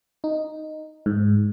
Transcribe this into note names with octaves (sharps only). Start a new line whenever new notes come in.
D#4
G#2